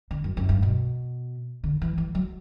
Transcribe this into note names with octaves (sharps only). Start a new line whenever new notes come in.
D3
F#2
F#2
G2
B2
D3
E3
E3
F#3